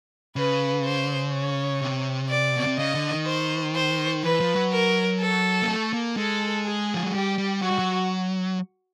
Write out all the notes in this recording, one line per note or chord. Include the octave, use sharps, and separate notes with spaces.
C#3 B4
C5
C#5
C3
D5
B2
C3
C#3 D#5
D3
D#3
C5
C5
E3 B4
F3
F#3
A#4
A4
A#3
A3
A#3
G#3 A4
G#4
F3
F#3
G3 G4
G3
F#3 F#4
G3
F#3